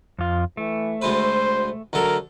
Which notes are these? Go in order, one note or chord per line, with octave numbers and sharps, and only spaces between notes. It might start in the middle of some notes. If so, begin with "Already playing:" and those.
F2 F4
E3 A3
D2 G#3 B4 C5
D2 F#3 A4 A#4